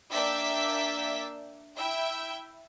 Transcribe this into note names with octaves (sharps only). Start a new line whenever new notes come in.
A#3 D4 D5 E5 G5 B6
E4 E5 G5